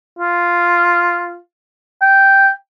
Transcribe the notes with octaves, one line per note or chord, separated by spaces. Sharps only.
F4
G5